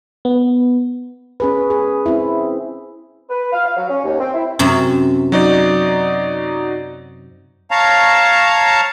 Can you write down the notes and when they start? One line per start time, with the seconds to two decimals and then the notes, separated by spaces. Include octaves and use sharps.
0.25 B3
1.40 C#4 G#4 B4
1.70 G#4
2.06 C4 E4
3.30 B4
3.53 F5
3.65 F5
3.76 F#3
3.89 C#4
4.04 D#2
4.20 C4
4.34 E4
4.59 F#2 C3
5.32 F#3 D#4 D5
7.71 C#5 F5 A5 A#5